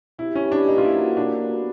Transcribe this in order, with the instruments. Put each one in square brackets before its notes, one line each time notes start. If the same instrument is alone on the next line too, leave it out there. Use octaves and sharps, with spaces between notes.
[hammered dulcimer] C3 [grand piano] E4
[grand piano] C#4
[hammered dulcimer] E3 G3
[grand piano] D4
[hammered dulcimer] A#2 [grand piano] D#4
[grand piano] F4
E4
[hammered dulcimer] F#3 A#3 C#4
[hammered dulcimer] C#3 [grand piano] D4
[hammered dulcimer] F#3 B3